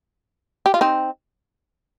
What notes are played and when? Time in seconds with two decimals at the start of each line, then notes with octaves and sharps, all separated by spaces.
0.66 G4
0.74 F4
0.81 C4 D#4